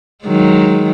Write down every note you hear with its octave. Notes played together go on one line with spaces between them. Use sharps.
D#3 F#3 G#3